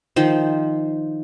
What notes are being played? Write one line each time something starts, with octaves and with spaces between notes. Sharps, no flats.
D#3 F3 C5